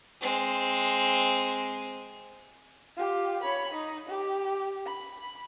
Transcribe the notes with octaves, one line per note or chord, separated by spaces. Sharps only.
G#3 C4
F4 G4
C#5 B5
D#4
G4
B5